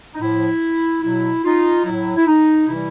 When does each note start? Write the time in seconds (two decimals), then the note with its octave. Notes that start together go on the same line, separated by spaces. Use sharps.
0.15 D#4
0.20 A2 F3 E4
1.02 B2 F#3 E4
1.44 D#4 F4
1.85 A2 F#3 E4
2.16 E4
2.27 D#4
2.68 C3 E3 G3 E4